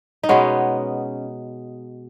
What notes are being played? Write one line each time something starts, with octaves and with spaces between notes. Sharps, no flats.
D#4
B2 G#3 B3 C#4